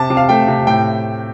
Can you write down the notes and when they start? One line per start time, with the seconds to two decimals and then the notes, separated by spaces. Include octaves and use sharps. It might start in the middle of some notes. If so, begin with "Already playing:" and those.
Already playing: C3 A5
0.10 C3
0.17 F5
0.29 A3 G5
0.48 C3
0.67 A2 G5